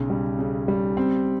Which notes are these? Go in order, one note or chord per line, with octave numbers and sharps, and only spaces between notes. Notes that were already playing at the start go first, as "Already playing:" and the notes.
Already playing: B1 C#3
G3
C#3
G3
C4